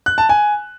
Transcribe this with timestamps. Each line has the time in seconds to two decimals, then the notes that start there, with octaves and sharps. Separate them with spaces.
0.06 F#6
0.18 A5
0.29 G#5